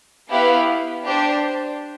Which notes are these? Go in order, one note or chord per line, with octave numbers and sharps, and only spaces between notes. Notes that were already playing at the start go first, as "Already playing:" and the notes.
B3 E4 G4 B4 F5
D4 G4 C5